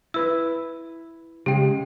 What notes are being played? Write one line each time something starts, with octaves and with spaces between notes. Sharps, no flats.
E4 B4 E6
C#3 G#3 G4 G5